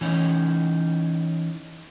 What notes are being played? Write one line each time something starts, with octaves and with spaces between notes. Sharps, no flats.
E3 C#4 D#4